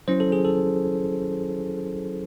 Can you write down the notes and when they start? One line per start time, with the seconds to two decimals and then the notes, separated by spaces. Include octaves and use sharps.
0.08 F#3 C#4 E4 C5
0.20 A4
0.32 G#4
0.45 A4